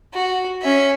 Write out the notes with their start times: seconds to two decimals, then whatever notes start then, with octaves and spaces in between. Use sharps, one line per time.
0.13 F#4
0.62 C#4 E5